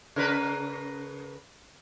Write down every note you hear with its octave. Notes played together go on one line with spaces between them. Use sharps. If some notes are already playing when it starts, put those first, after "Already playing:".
C#3 A#4 B4